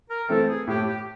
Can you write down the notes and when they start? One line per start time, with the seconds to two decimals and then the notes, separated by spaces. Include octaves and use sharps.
0.09 A#4
0.29 E3 A3 C4 A4
0.48 G#4
0.67 A2 G4
0.87 G4